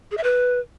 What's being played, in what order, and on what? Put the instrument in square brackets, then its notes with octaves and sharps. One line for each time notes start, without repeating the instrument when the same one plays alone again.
[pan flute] G#4
E5
B4